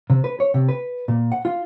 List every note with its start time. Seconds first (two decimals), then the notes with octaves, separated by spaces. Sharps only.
0.10 C3
0.24 B4
0.40 C#5
0.54 C3
0.69 B4
1.08 A#2
1.32 F#5
1.45 F4